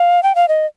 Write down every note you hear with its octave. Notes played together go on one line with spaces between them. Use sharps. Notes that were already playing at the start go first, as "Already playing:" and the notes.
Already playing: F5
G5
F5
D#5